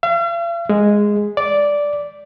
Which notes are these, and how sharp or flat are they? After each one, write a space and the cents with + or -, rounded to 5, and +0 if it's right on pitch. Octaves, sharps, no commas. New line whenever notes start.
F5 -45
G#3 -5
D5 -10